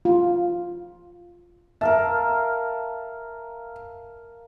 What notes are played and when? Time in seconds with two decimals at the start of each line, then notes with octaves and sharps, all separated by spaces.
0.05 F4
1.81 A#4 E5 F5 A5